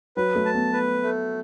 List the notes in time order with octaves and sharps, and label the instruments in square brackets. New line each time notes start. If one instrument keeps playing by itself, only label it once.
[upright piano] F#3 [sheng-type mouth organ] B4
[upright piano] A3
[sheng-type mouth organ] A5
[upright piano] B3
[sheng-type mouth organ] B4
A3